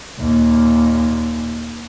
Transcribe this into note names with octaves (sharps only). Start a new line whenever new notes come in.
D#2 A#2